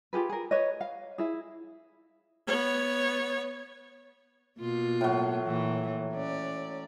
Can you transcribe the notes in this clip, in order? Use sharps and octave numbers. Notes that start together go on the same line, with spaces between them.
F4 G4 G#4 B4
G#4 A#4
B4 C#5 D#5
F5
E4 G#4
B3 C#5
B2 A#3 F4
A2 F#3
A#2 E3
C#4 D5